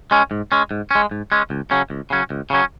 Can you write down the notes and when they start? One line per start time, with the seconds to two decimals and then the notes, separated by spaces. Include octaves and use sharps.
0.11 G#3 C#4
0.31 G#2
0.52 G#3 C#4
0.71 G#2
0.91 G#3 C#4
1.11 G#2
1.32 G#3 C#4
1.50 C#2
1.71 C#3 F#3 C#4
1.90 C#2
2.10 C#3 F#3 C#4
2.30 C#2
2.50 C#3 F#3 C#4